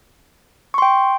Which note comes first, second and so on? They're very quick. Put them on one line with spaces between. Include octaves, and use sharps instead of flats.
C#6 C6 G5